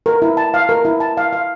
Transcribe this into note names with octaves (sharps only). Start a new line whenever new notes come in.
A#4
E4
A5
F5
A#4
E4
A5
F5
F5